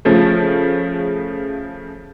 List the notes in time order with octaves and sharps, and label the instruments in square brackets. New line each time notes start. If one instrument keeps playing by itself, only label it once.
[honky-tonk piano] C#3 F3 A3